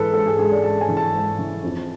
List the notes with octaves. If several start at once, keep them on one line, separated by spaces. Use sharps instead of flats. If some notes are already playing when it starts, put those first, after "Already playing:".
Already playing: G#2 E3 A4 B4
G#2 A4
G#4
G#2 G#4
D5
G#2 A5
G#5
E3
A5
G#2
E3
F2